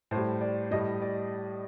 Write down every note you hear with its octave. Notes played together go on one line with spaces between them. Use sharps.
A2 C5
G3
D5
A2 G3 D#5
D5